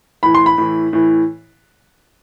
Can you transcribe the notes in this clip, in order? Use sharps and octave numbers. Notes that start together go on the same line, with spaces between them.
A2 E3 B5
C6
B5
A2 E3
A2 E3